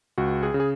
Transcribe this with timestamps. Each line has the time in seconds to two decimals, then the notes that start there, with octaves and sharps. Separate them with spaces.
0.18 C#2 F#4
0.43 G#4
0.54 C#3
0.60 G#4